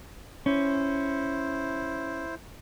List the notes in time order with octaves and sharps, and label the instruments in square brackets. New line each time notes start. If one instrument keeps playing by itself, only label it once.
[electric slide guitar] C#4 [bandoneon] E4 C5